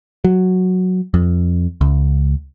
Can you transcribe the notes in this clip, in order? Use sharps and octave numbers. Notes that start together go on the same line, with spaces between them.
F#3
F2
C#2